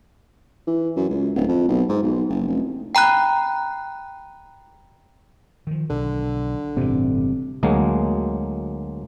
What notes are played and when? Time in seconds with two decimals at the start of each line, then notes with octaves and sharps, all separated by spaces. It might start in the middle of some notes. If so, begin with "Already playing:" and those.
0.67 E3
0.96 F#2
1.09 C#2
1.35 D1
1.48 F2
1.69 B1
1.89 G#2
2.03 B1
2.29 F#1
2.48 F1
2.95 G5 A#5 B5 F#6
5.67 D#3 F3
5.90 B1 D3
6.77 G1 A2 C3 E3 C4
7.63 D2 F#3 G#3 A#3